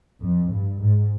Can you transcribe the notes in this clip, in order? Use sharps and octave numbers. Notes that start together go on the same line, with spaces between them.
F2
G2
G#2